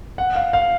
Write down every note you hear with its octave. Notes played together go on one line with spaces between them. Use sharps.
F#5
F5
F5